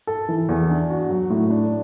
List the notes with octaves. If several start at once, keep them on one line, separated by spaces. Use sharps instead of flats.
A4
E3
E2
D4
F#4
F#3
A2
D4